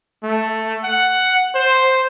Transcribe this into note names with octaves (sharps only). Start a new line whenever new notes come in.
A3
F#5
C5